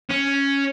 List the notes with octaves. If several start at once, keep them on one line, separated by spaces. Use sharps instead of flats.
C#4